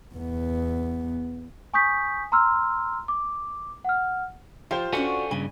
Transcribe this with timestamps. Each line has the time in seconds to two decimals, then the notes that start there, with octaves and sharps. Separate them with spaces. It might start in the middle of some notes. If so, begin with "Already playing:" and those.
0.14 E2 B3
1.74 G#5 C#6 D#6 G6 B6
2.32 A#5 C6 E6 F6
3.08 D6
3.85 F#5 F6
4.71 F3 F4 G4 C5
4.93 C#4 D4 F#4 A4 F#5 G#5
5.31 G2 C#3 G#5